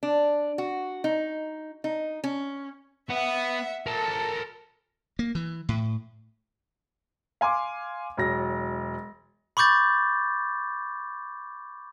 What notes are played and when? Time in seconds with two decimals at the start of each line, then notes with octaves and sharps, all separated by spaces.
0.03 D4
0.58 F#4
1.04 D#4
1.84 D#4
2.24 C#4
3.09 B3 E5 F#5
3.87 A4 A#4 A5
5.19 A#3
5.35 E3
5.69 A2
7.41 F5 G#5 C6 D6
8.17 E1 F#3 A#6
9.57 B5 C#6 D6 G6 A6